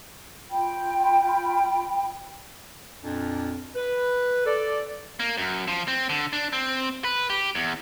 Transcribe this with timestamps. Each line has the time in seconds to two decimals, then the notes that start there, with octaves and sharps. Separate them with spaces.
0.49 F4 G5 B5
3.04 F2 A#2 D4
3.75 B4
4.46 A4 D5
5.20 A#3
5.38 F#2
5.67 F3
5.88 C4
6.09 D3
6.33 D4
6.53 C4
7.04 B4
7.30 G4
7.55 E2